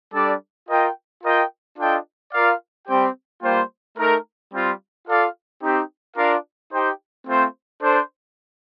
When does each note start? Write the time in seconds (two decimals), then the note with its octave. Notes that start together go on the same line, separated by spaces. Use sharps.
0.14 G3 D4 A4 D5
0.69 F4 A#4 D#5 G5
1.24 F4 A#4 D#5 G5
1.78 D4 F4 A4 D#5 G5
2.34 F4 A#4 D5 F5
2.88 G3 C4 G4 C5 G5
3.43 G3 A#3 F4 C5 G5
3.98 A3 D#4 A#4
4.53 G3 C4 F4
5.07 F4 A4 D5 F5
5.62 C4 D#4 G4
6.17 D4 F4 A#4 D5 F5
6.72 D#4 G4 C5 G5
7.27 A3 C4 F4 C5
7.82 D4 A4 C5